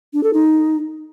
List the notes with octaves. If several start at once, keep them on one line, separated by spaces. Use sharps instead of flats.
D4
A4
D#4